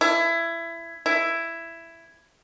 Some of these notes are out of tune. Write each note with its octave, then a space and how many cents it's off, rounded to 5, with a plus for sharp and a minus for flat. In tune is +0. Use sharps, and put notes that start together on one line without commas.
E4 +20
E4 +10